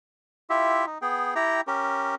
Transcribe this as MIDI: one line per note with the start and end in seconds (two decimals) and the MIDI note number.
0.50 0.85 64
0.50 0.85 65
0.50 0.85 67
0.50 0.85 76
0.86 0.98 63
1.02 1.34 59
1.02 1.34 68
1.02 1.34 79
1.35 1.61 64
1.35 1.61 67
1.35 1.61 79
1.35 1.61 82
1.67 2.15 61
1.67 2.15 67
1.67 2.15 70